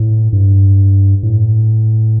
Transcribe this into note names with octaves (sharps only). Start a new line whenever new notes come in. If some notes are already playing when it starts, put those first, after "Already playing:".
Already playing: A2
G2
A2